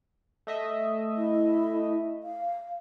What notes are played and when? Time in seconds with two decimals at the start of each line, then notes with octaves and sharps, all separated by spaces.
0.47 A3 D#5 E5
1.17 E4
2.23 F5